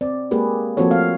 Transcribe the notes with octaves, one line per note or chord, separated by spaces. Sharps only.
C4 D5
G#3 A#3 G4 G#4 B4
F3 A#3 C4 F#4 A4 C#5
A3 F5